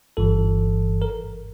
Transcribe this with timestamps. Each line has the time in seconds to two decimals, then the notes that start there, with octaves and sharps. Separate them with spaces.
0.17 G1 G2 E3 A4
1.02 A#4